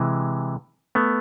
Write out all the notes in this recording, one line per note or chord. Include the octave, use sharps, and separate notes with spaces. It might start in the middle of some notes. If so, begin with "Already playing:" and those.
Already playing: C3 E3 G#3
A3 B3